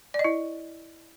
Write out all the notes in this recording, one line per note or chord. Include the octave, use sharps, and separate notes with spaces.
D5
D#5
E4